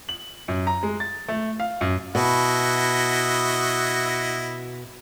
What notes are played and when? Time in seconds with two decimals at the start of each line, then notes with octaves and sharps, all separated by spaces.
0.09 F#7
0.48 F#2
0.67 A#5
0.83 G#3
1.00 A6
1.29 A3
1.60 F5
1.81 F#2
2.15 B2 E4 F#4 D#5